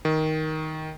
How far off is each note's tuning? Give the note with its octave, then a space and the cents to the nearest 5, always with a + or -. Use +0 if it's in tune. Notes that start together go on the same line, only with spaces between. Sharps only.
D#3 +10